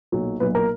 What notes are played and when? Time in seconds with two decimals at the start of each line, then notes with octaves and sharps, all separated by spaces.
0.12 B1 A#2 F#3
0.40 B1 A#2 F#3 B4
0.55 A#4